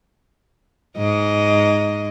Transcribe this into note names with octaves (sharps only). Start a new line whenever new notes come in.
G#2 D#5